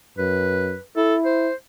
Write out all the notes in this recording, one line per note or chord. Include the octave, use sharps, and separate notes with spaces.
F#2 B4
E4 A4
C5